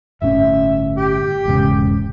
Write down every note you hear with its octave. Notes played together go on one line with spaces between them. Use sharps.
G1 A2 C#4 E5
G4
E1 G#2 C#3